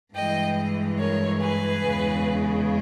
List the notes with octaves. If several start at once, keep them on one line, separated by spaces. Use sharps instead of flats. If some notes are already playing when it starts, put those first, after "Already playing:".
G2 E3 G#3 D#5 G5
A#4 C#5
G#4 B4
E2 C#3 G#3